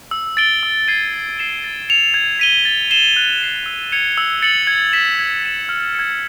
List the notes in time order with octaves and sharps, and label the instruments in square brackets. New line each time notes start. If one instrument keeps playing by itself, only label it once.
[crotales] E6
A6 D7 G7
E6
G#6 C7 D#7
A6
C7 E7 G7
A6
C#7 F7
G#6
B6 D#7 G7
A6
C7 E7 G7
F#6
A6 C7 E7
E6
G#6 C#7 F7
E6
A6 C#7 F#7
G#6
B6 E7
G#6
B6 E7
F6
G#6 C#7